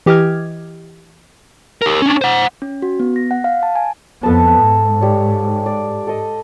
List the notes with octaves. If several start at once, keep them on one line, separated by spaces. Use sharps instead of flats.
E3 G4 D#5 D6 F6 G#6
G4 A#4
C#4 D4
C5 F#5
C#4
F#4
B3
A#6
F#5
F5
A5
G#5
F2 B3 A4 A5
G#2
G3 C#5
D5
A4 D#5